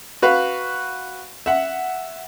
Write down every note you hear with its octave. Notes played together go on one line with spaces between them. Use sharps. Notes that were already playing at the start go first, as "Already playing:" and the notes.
F#4 B4 F5
E5 F#5